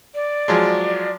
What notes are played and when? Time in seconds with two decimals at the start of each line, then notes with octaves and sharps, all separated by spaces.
0.15 D5
0.48 F3 F#3 G#3